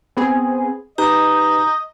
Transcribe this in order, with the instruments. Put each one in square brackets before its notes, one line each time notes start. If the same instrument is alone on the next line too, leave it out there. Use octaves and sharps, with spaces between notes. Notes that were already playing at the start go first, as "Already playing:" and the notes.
[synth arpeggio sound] B3 C4 G#4
[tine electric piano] D#4 G4 B4 [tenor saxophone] D#5 [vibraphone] A#5 [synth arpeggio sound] G6